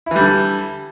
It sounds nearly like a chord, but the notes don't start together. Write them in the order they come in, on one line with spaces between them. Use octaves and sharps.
E4 E3 G3 D3